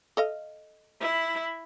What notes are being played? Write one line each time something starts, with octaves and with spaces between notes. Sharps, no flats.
A4 D#5 F5
E4